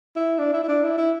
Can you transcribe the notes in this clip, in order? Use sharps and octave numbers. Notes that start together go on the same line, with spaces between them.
E4
D4
E4
E4
D4
E4
E4